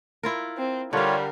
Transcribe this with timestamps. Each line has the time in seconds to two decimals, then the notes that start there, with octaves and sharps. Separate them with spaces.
0.23 E4 F4 A#4
0.57 C4
0.93 D3 G3 F4 A#4 C#5 F5